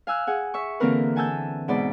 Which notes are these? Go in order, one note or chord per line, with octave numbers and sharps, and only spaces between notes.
F5 G#5 E6 F#6
G#4 F#5 G#5
E5 C#6
D3 E3 A#3 C4 A#4 B4
F#5 G#5 A5 E6 G6
G#2 B2 C5 D5 B5